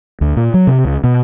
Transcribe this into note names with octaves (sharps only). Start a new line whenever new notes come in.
D2
A#2
F#3
C3
C#2
B2